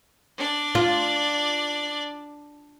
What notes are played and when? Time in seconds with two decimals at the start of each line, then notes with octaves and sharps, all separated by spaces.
0.38 D4 D5
0.75 F4